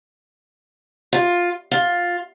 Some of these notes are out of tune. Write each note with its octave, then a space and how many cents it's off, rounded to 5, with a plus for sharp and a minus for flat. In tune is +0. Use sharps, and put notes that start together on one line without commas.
F4 +10
F4 +10